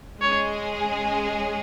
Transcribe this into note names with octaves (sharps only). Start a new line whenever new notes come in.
G#3 C#4 G#4 C#5